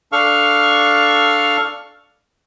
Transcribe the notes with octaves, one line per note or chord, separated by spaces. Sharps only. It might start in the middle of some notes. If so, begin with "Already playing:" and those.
D4 A4 F5 C#6 F6